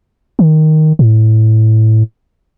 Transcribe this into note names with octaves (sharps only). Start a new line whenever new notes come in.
D#3
A2